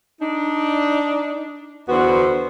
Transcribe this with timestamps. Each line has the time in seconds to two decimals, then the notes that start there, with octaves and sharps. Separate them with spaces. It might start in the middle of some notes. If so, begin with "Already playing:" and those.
0.21 D4 D#4
1.88 E2 D3 B3 F#4 C5